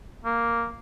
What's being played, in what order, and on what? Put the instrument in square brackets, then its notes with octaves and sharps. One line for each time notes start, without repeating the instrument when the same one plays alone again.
[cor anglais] A#3